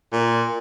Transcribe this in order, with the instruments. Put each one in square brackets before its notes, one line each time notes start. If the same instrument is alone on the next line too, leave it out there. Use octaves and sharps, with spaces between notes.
[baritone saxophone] A#2